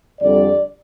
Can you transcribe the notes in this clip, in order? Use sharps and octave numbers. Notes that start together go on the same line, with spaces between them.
F2 D3 G3 D5